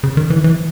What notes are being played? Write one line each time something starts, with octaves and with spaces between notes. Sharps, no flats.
C#3
D#3
E3
E3